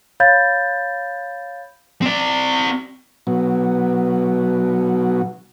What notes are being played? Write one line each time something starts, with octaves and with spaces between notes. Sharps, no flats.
C#5 F5 B5 G6 A6
C4 D5
B2 F#3